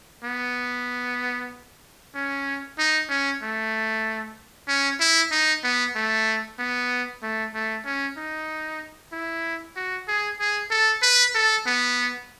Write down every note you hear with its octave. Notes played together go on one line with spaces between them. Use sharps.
B3
C#4
D#4
C#4
A3
C#4
E4
D#4
B3
A3
B3
A3
A3
C#4
D#4
E4
F#4
G#4
G#4
A4
B4
A4
B3